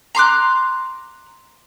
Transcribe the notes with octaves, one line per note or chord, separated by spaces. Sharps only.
A#5 C6 D6 F#6